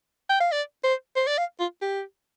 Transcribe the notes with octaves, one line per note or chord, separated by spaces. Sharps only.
G5
F5
D5
C5
C5
D5
F5
F4
G4